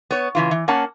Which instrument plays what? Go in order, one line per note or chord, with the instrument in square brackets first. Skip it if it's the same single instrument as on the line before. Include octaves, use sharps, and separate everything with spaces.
[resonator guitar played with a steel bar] B3 C#5
C#3 E3 F4
E3
A#3 C#4 F#5 A5